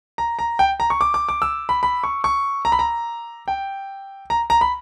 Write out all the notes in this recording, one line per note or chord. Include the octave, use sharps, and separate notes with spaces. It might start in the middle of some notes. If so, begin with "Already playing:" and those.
A#5
A#5
G5
A#5
C#6
D6
D6
D6
E6
B5
B5
C#6
C#6
A#5
B5
A#5
G5
A#5
A#5
B5